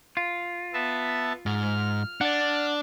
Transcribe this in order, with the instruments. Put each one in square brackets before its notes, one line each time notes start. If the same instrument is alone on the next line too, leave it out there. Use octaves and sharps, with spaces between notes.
[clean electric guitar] F4
[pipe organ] B3 E5 A5
[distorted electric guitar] G#2 [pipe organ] F6
[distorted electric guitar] D4 [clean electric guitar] D5 F#5